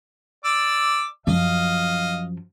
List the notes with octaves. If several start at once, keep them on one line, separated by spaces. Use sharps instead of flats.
D5 D6 E6
F#2 F3 D#5 F5